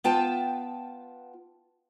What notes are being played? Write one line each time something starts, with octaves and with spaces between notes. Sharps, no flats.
B3 F4 G5 A5